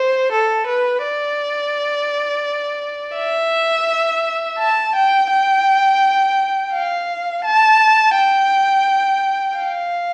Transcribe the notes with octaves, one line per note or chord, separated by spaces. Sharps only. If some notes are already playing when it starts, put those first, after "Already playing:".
Already playing: C5
A4
B4
D5
E5
A5
G5
G5
F5
A5
G5
F5